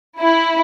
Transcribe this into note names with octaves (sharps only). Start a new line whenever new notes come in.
E4